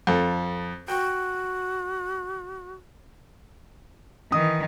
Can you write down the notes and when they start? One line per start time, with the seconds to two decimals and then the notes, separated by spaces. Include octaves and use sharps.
0.07 F2 A4
0.88 F#4 G5
4.32 D#3 E3 D#6